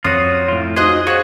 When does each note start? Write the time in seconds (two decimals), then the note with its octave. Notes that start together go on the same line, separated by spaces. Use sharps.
0.05 F2 F4 F#4 C#5 D#6
0.48 A2 F4
0.76 D#4 F4 F#4 G#4 C5 D#5 F#6
1.07 F#4 G#4 C5 C#5 F5 C#6